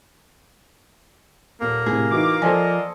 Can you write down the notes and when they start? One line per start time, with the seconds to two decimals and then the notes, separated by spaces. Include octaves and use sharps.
1.61 D#1 A#3
1.86 A2 C3 G#4
2.11 E3 D#4 E4 F#4 D6
2.42 F3 A4 C5 D5 D#5 G#5